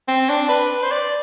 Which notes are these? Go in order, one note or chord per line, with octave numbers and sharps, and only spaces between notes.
C4
D4
B4
C5
D5